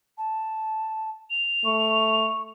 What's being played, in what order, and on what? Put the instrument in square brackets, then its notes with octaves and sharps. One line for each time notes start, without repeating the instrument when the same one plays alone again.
[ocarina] A5
[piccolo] F7
[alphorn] A3 [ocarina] C#6